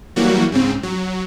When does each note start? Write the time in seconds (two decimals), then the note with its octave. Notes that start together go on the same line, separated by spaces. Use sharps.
0.16 E3 F#3 G3 A#3 F#4
0.52 G#2 C#3 C4
0.83 F#3